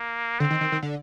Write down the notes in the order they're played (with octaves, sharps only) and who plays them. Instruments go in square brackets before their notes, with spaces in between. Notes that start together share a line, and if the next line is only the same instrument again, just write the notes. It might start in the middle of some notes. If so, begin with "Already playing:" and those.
Already playing: [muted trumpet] A#3
[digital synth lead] D3 [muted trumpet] C4
[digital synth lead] D#3
D#3
D#3
D3